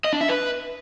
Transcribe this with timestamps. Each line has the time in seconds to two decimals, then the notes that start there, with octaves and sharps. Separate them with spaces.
0.05 D#5
0.13 D4
0.21 E5
0.29 B4